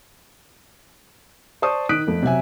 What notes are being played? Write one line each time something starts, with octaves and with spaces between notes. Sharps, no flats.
C5 D5 A5 C#6 D#6
D#3 D#6 F#6 B6 D7
F2 A3
C3 F#3 E5 G#5